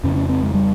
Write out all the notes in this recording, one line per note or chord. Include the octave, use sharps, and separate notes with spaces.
F2 C#3 C#4
C#4
C4
G#3
G3